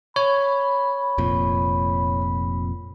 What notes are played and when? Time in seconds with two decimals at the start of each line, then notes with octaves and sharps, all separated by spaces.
0.16 C#5 B5
1.18 F1 F2 A#2